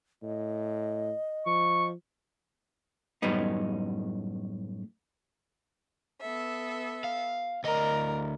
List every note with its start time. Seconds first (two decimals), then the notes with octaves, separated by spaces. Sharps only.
0.23 A2 D#5
1.46 F3 C#6
3.22 F#2 A2 G3 B3 D#4
6.21 B3 A4 E5
7.04 F5
7.64 D2 A#4 D5 D#5